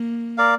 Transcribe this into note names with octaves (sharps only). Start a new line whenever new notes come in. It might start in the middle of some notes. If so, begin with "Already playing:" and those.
Already playing: A#3
A#4 D5 F5